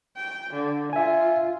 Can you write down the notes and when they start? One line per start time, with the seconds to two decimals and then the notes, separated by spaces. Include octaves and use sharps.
0.16 G5
0.54 D3
0.93 F4 E5 G#5